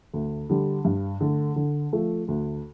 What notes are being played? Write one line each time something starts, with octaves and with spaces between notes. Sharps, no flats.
D2
D3 G3
G2
D3 A3
D3
F3 A3
D2